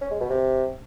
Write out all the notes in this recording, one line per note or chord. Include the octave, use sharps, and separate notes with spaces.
C#4
G#3
B2
C3